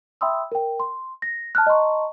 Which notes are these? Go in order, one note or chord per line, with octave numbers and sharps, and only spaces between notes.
E5 G5 B5 C6 D#6 E6
A#4 G5
C6
A#6
A5 F6 F#6
D#5 A5 A#5 C6 C#6